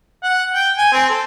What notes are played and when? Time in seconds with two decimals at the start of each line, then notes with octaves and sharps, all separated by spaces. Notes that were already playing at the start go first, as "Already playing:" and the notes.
0.23 F#5
0.54 G5
0.78 G#5
0.92 C4
1.09 A4